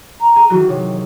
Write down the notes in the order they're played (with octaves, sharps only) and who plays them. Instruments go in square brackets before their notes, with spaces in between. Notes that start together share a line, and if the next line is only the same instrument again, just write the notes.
[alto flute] A#5
[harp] G#4
[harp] D#3 E3 F#3 [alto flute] F#4
[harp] C3 [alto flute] C#5